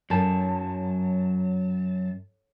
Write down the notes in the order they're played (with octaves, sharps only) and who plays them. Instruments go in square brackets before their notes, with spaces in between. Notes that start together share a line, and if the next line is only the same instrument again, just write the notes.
[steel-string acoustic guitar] F#2 [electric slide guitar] F#3 A5